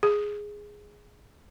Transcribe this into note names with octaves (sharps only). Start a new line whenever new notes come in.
G#4